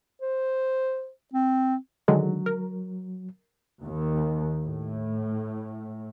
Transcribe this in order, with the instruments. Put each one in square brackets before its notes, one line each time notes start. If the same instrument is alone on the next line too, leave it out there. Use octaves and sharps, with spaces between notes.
[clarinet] C5
C4
[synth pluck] D3 D#3 G#3 [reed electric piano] F#3
[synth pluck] A#4
[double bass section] D#2
A2